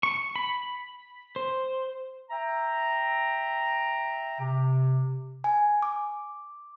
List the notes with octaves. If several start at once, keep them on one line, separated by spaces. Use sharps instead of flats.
C#6
B5
C5
E5 G5 A#5
C3
G#5
D6